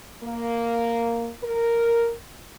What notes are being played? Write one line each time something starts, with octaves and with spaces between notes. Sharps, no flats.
A#3
A#4